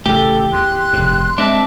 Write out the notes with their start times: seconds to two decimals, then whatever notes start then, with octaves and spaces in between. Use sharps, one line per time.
0.06 A1 C#3 A3 G4 A4
0.53 E2 C6 F#6
0.93 F1 G#2
1.38 G#3 C4 D4 E5 A5